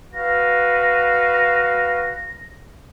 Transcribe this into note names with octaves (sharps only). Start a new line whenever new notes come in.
F#4 B4 F5 A#6